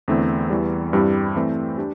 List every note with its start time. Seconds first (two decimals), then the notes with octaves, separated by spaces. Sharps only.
0.08 E2 D3 A3 C4 E4
0.50 E2 E3 G3
0.93 G2 G3 C4 E4 G4
1.36 E3 A3 C4
1.78 D4 G4